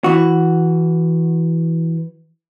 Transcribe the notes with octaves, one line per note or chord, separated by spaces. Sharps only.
E3 F#4